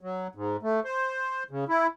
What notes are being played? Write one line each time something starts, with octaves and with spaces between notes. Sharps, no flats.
F#3
G#2
A3
C5
C#3
E4